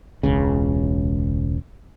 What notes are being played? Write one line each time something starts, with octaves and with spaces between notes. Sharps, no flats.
E1 C#2 C#3